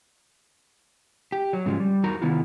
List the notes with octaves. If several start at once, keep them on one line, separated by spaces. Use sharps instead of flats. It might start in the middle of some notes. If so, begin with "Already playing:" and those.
G4
F#3
G#2 C#3 F3 G#3
G3
E2 D#4 F#4 A#4 A#5
C3 D#3 B3 E4 F4